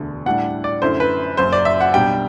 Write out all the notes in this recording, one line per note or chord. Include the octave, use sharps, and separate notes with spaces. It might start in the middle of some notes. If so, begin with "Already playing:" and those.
Already playing: E1 D2 D3
A2 G3 D4 F#5
D5
F#2 D3 A3 E4 C5
B4
F#1 F#2 F#3 C5
D5
E5
F#5
B1 B2 G3 D4 G5